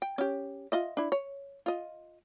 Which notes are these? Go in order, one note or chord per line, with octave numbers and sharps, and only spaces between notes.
G5
C#4 G4
F4 D#5 E5
D4 E4
C#5
F4 D#5